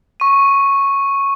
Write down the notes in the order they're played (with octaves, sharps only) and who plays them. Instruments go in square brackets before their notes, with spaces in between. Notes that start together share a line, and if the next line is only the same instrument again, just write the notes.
[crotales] C#6 D#7